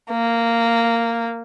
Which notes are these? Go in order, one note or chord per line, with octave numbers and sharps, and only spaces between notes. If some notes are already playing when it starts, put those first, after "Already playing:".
A#3